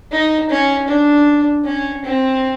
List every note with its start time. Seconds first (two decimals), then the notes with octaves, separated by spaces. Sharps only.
0.12 D#4
0.50 C#4
0.88 D4
1.65 C#4
2.04 C4